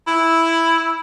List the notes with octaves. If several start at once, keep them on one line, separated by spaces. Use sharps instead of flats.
E4